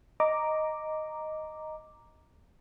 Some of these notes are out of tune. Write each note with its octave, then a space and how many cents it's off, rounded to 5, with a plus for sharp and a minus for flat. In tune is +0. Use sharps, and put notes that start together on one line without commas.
D#5 +0 A#5 +0 D6 +0